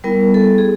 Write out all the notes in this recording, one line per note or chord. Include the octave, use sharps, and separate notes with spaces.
G3 B3 E4 A#4
A4
G#4